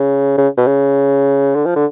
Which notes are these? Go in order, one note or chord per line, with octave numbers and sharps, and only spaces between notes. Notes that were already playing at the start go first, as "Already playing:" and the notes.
Already playing: C#3
C#3
B2
C#3
D3
F3
D3